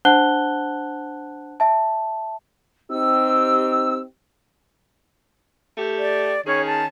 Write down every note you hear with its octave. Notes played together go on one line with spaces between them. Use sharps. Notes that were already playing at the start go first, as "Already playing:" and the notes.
D4 C5 F#5 A5 F#6 G7
E5 A5
C4 D#4 G4 E6
A3 G4
D5
D#3 C#4 G#4 C#5
A5